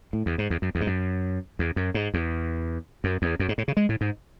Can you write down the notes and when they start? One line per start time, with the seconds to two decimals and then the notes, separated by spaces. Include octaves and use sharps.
0.13 A2
0.26 E2
0.38 G#2
0.50 E2
0.62 F#2
0.75 E2
0.81 G#2
0.87 F#2
1.59 E2
1.76 F#2
1.94 G#2
2.14 E2
3.04 F#2
3.22 E2
3.40 F#2
3.49 G#2
3.58 A2
3.68 C#3
3.77 G#3
3.89 A2
4.01 G#2